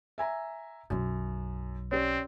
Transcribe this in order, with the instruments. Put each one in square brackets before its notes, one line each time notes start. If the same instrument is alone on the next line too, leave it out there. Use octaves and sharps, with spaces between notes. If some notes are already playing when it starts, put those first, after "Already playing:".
[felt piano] E5 G#5 A#5
[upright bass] B1 F#3 [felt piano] F#2
[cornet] C4 [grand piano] C#4 G4 D5